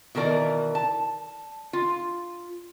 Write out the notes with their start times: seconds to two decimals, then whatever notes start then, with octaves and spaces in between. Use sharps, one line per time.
0.15 B2 D#3 E3 A#4 D5
0.75 A5
1.73 F4